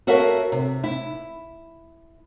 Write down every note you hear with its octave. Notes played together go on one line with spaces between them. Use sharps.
F#4 A4 A#4 C#5 E5 F5
C3
E4